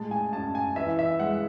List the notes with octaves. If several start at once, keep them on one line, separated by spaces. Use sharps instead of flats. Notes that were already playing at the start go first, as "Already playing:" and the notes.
Already playing: A2 G#3 A5
G#5
F#2 A5
G#5
E3 E5
E5
G#3 F#5